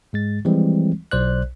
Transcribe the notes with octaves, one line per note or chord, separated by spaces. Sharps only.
G#2 G#3 A6
E3 F3 G3 G#3 C4
B1 C5 D5 F#6